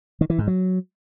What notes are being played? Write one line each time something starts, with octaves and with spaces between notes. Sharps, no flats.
D#3
E3
G#2
F#3